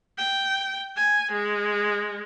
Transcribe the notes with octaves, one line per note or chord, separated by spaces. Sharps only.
G5
G#5
G#3